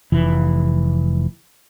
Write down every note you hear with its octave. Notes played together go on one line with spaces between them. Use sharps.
F1 E3